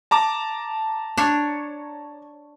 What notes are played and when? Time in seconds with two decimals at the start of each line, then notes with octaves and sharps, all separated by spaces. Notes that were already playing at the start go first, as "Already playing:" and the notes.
0.11 A5 A#5 D6
1.17 D4 C#5